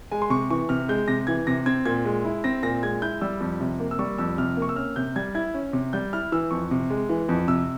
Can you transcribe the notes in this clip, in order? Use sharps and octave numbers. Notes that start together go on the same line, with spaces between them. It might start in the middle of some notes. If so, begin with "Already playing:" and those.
G#3 G#5
C6
C3 C#6
E3 C#6
C3 F6
G#3 G6
C3 A#6
E3 G#6
C3 A#6
C4 G#6
A#2 G#6
G#3
E4
C4 A#6
A#2 A#6
G#3 G#6
E4 G6
G3 E6
F2
C3
A#3
E6
G3 C#6
F2 E6
C3 F6
A#3 C#6
E6
C#4 F6
C3 G6
G3 G#6
E4 G#6
C#4
C3
G3 G6
E4 F6
E3 E6
F2 C#6
C3
G#3
E3
F2
C3 E6